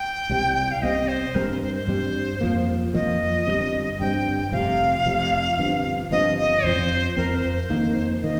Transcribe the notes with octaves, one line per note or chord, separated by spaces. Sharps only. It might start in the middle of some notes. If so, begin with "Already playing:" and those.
Already playing: G5
C2 C3 G3 C4
F5
C2 C3 G3 C4 D#5
C5
G2 G3 C4 A#4
C5
C5
C5
G2 G3 C4
F2 F3 A#3
F2 F3 A#3 D#5
G1 G2 G3 C4
G1 G2 G3 C4 G5
F1 F2 C3 F5
F1 F2 C3
G1 G2 F3 C4
G1 G2 F3 C4 D#5
D#5
F2 F3 C4 C5
F2 F3 C4 A#4
C5
C5
F2 D#3 A#3
D#3 A#3 D#5